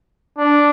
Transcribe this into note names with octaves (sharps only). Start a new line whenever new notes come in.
D4